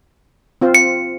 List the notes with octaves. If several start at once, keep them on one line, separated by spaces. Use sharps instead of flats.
C4 F4 C5
C#7